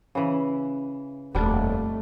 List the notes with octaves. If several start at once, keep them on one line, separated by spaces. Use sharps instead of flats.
C#3 E3
D#1 F2 G3 A3 D4